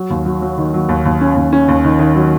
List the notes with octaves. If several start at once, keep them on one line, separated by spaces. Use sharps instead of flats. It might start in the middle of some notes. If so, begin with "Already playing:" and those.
Already playing: F#3
D#2
F#3
F#3
D#3
F#3
D#2
D#2
C#4
D#2
C#4
D#2
D#3
D#3
F#3